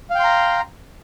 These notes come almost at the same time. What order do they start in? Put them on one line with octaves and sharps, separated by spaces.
F5 G5 C6 A#5